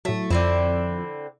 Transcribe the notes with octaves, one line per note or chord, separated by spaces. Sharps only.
A2 F#3 A3
F2 D3 C4 E4